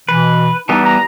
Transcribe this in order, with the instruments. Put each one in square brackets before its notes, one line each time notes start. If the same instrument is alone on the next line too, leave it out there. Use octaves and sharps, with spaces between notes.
[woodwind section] B2 E3 [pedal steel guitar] B4
[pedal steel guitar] E3 G3 B3 [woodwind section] D#4 F#5 A5
[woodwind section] A#5